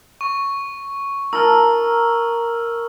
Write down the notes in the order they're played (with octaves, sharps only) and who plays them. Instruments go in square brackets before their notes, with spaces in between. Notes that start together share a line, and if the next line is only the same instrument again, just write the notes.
[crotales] C#6
[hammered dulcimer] A#4 A5 [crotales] E6 F6